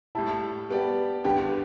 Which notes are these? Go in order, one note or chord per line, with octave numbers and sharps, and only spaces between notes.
A2 G3 E4 A5
G3 B3 G4 D5
G2 D3 B3 G4 G5